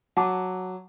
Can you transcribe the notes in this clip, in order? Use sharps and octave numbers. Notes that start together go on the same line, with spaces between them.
F#3 F#5 A5 D6